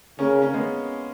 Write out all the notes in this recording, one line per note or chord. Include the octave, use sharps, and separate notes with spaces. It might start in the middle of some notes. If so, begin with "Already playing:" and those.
C#3 A#3 C#4
C#4
G#3 B3